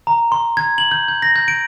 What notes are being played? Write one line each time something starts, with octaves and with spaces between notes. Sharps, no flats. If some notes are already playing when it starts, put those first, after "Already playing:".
A#5
C6
G#6
F#7
G6
G6
A#6
G6
D7